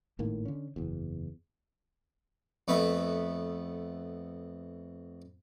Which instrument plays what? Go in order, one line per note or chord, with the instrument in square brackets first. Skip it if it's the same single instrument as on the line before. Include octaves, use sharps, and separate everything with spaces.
[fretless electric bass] G#1 A2 D#3 A#3
D3 C#4
F#1 E2
[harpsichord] F2 A3 B3 E5